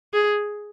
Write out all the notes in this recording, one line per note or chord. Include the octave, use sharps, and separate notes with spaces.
G#4